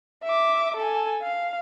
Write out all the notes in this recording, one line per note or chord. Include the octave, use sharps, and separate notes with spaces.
E5 D6
A4 G#5
F5